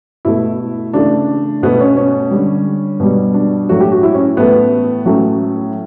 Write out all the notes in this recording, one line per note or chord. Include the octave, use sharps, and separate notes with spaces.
B2 A3 E4
C#3 E3 A3 D4
B2 A3 B3
C#4
C#4
D3 G3
B2 G3
D4
A2 F#3 A3 F#4
G4
F#4
E4
C#4
A2 E3 A3 B3
A2 F#3 A3 C#4